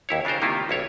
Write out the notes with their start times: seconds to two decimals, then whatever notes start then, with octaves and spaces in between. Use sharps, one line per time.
0.09 D#2 E4 C#5
0.25 C#3 D4 F4 A#4 C5
0.41 C3 D#3 G3 A#3 E4 F4
0.69 B1 E4 C#5